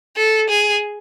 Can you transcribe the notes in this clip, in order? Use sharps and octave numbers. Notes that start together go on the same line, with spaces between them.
A4
G#4